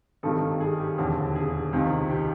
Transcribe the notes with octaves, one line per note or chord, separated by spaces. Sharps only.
G#1 G2 D#3 G3 A4
G#4
G4
E1 D#2 D3
G#4
C#2 C3 D#3
G4